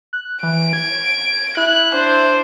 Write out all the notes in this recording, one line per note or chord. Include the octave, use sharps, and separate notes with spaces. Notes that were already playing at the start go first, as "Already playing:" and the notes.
F#6
E3 D7
G#6
E4 F#6
D4 C5